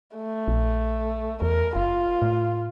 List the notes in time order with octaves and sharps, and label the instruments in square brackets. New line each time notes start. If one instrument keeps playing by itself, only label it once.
[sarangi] A3
[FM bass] A#1
[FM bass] E2 [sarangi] A#4
[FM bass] F#1 [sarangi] F4
[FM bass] A2